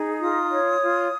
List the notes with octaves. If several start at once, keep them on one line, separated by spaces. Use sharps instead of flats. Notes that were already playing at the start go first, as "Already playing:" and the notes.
Already playing: D#4 G#4
F4 D#6
C#5
F4